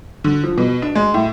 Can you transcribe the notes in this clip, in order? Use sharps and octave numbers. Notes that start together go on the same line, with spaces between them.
D3
F3
B2
D4
G#3
A2